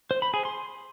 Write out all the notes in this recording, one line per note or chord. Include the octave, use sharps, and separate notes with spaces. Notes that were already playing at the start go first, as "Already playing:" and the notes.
C5
B5
G#4
C6